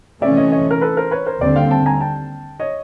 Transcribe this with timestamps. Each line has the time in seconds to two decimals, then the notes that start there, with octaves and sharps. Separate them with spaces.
0.22 C3 E3 A3 C#4 D5 E5
0.37 C#5 D#5
0.52 C#5 D#5
0.71 A#4
0.81 A4 B4
0.97 A#4 C5
1.11 B4 C#5
1.26 A#4 C5
1.41 D#2 D3 G3 C4 C5 D5
1.56 F5 G5
1.70 G5 A5
1.86 G#5 A#5
2.01 G5 A5
2.60 C#5 D#5